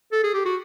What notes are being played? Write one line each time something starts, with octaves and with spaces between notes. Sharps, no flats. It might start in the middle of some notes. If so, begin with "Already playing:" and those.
A4
G#4
G4
F#4